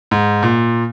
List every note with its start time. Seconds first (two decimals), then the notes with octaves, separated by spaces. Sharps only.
0.11 G#2
0.43 A#2